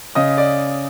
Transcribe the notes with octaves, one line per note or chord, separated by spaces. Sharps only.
C#3 D#5 D#6
D5